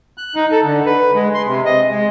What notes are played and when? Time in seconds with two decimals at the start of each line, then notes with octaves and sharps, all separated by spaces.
0.18 F#6
0.35 D#4
0.52 A4
0.63 D3
0.86 B4
1.15 G#3
1.34 C6
1.47 C3
1.65 D#5
1.90 G#3